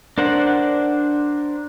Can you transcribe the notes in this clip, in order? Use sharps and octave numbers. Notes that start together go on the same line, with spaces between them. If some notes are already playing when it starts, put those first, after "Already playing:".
D4 A#4 C5 F#5